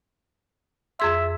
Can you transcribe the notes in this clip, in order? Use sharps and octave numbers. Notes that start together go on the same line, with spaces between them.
F2 G#4 E5 C6